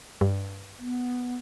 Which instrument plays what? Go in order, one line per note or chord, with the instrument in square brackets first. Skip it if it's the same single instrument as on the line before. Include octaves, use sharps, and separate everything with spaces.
[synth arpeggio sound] G2
[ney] B3